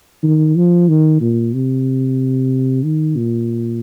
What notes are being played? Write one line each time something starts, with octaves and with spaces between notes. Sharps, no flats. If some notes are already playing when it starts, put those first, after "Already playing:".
D#3
F3
D#3
A#2
C3
D#3
A#2